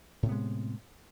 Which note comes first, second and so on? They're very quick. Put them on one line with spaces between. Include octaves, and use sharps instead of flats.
A2 C3 B3 G#3